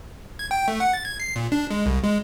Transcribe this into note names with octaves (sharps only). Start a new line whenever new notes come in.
G#6
G5
A3
F#5
A6
G#6
C7
A#2
D4
G#3
C2
G#3